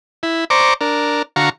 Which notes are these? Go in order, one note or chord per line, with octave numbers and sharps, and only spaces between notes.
E4
C5 D5 A#5 C#6 D6
D4 A#4
D3 F#4 F5 A#5 C#6